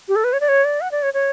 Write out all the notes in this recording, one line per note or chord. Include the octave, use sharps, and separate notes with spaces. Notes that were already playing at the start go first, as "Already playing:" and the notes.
G4
A4
B4
C#5
D5
C#5
D5
F#5
D5
C#5
C#5